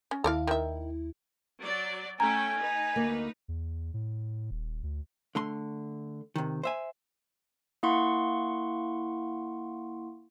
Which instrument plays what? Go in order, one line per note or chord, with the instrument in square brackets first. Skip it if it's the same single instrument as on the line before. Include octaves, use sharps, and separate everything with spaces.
[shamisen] C#4
[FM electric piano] D#2 E4 [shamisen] A4 D5 F5
[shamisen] D#3 E5
[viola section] F#3 D5
[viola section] A3 C#4 G5 [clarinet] G#5 [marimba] A#5
[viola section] D#4 B4
[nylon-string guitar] D2 A#3
[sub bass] E2
A2
D#1
D2
[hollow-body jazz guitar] D3 A3 C6
C3 D#3
C5 E5 G#5
[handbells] A#3 E4 F#5 C6 C#6